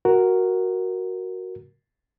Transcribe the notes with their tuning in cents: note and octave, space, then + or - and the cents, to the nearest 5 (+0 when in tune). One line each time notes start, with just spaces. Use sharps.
F#4 +0 A#4 +0